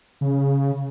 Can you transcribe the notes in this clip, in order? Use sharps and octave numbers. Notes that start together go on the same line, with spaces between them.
C#3